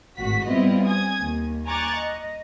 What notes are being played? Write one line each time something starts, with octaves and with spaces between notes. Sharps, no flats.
G#1 A2 F#4 B6
G3 B3 C4 E4 F4 D#5
G#5 D#6 G#6
D#2
G#5 A#5 C#6 D6 F#6 A6
D#5